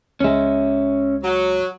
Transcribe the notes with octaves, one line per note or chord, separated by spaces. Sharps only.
C#2 G#3 C#4 E5
F#3